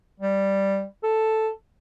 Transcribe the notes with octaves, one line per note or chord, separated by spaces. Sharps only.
G3
A4